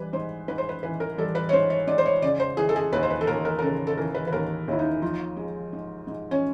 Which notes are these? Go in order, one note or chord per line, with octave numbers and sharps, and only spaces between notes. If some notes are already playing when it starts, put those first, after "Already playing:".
Already playing: E3 G3 B4
G#2 C5
G#2 B4
C5
B4
E3 B4
A#4
G3 A4
B4
C#5
G#2 C5
C#5
G#2 D5
C5
C#5
C#3 D5
C5
E3 G#4
A4
G#4
D#2 B4
C5
B4
A4
D#2 A#4
A#4
A#4
C#3 A4
A4
E3 A#4
B4
B4
D#2 A#4
D#2 E4
D#4
F3 D#4
G#3
G#2
G#2
C#4